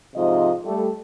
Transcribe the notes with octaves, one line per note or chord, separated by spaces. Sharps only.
G#2 C3 F3 F4 D#5
G3 A3 A4